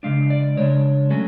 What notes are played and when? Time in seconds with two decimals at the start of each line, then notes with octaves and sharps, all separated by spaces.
0.03 C#3 G#3 D4 F5
0.30 D5
0.57 C#3 G#3 D4 C#5
1.10 F#3 A3 C#4